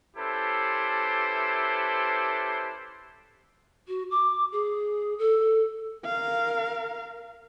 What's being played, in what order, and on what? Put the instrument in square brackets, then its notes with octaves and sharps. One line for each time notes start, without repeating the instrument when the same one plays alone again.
[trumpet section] C#4 E4 G4 A4 B4 C5
[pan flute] F#4
D6
G#4
A4
[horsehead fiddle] A#4 F5